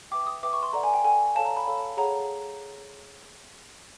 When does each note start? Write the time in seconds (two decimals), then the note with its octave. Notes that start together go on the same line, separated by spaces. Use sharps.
0.11 B4 E5 G5 D6
0.27 D#6
0.43 B4 E5 G5 D6
0.53 C#6
0.63 C6
0.73 A4 D5 F#5 A#5
0.83 G#5
0.94 G5
1.04 A4 D5 F#5 G#5
1.35 A4 C#5 F5 A5
1.45 A#5
1.57 B5
1.66 A4 C#5 F5
1.97 G#4 C#5 F#5 A#5